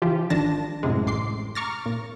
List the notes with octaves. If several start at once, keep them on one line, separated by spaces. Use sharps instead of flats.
C#3 E3 F3 F4 G4
G#1 D#3 D4 A5 A#6
F#2 A2 C3 G#3
A1 C6 D6 C7
A#5 C#6 D6 F6 A6 A#6
A#2